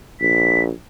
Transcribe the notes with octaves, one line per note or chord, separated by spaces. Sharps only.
A#1 B6